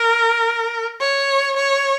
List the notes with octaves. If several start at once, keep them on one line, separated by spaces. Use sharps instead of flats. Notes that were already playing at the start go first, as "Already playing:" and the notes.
Already playing: A#4
C#5
C#5